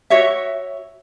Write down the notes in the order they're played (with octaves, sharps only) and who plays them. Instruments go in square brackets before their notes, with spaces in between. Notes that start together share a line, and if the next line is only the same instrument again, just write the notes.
[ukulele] F#4 C#5 E5